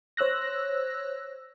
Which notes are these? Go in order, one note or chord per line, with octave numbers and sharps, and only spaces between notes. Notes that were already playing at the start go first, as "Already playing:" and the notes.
C5 C#5 E6 F#6 A#6